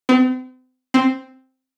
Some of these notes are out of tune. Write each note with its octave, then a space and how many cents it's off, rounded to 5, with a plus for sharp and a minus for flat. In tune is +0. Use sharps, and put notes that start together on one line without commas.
C4 -40
C4 +0